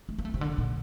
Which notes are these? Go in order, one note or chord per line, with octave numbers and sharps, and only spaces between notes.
A3
A#3
A3
C3
D3
A#2